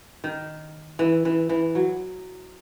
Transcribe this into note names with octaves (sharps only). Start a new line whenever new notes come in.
D#3
E3
E3
E3
F#3